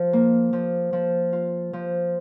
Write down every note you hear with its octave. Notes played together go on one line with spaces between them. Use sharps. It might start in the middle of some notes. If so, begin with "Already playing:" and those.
Already playing: F3
A#3
F3
F3
F4
F3